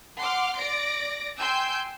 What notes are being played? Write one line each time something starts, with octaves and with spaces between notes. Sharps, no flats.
F#5 C6 D6 F6
D5 A#6 D7
G5 G#5 C6 E6 G6